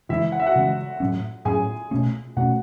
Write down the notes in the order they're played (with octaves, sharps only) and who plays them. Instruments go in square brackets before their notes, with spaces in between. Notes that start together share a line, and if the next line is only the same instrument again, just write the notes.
[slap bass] C#3 E3 G#3 [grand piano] E4 E5
[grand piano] F#5
E5
F#4 F#5
[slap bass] C#3 E3 G#3
A2 F#3 C#4
[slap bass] A2 F#3 C#4 [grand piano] G#4 G#5
[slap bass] B2 A3 C#4
[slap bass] B2 A3 C#4 [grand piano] F#4 F#5